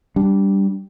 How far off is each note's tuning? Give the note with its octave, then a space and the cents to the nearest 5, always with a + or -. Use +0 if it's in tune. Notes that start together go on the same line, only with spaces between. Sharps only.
G3 +0 D4 -10